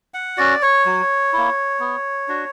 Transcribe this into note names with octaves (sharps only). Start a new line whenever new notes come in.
F#5
C#4 F#4 D5
C#5
F#3
A#3 E4
B3
D4 F#4